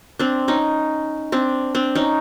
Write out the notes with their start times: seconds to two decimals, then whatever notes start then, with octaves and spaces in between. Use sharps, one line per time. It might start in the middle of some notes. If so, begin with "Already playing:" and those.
0.19 C4 D4
0.48 C#4 D#4
1.32 C4 D4
1.75 C4 D4
1.95 C#4 D#4